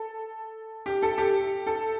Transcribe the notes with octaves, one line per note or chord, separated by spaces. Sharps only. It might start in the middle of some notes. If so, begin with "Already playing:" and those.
Already playing: A4
G4
A4
G4
A4